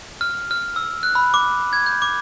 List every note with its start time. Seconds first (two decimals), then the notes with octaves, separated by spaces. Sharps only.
0.21 F6
0.51 F6
0.76 E6
1.03 F#6
1.15 B5
1.34 D6
1.73 G#6
1.86 G6
2.02 D6